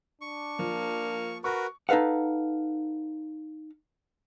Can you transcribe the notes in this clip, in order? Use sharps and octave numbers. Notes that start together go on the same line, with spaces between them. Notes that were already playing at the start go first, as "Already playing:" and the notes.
D4 C#6
F3 A#3
F#4 A#4 B4 C#6
D#4 A4 B4 F5 F#5